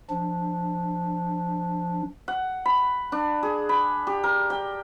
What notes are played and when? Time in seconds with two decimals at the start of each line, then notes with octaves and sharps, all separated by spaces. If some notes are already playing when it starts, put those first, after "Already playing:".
0.10 F3 D4
2.28 F#5
2.65 B5
3.12 D4
3.43 G#4
3.69 B5
4.07 G4
4.24 A#4
4.50 G5